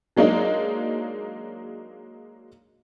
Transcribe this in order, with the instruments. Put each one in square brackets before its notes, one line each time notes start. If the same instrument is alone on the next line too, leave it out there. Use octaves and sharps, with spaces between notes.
[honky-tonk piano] F#3 G#3 A#3 D4 D#4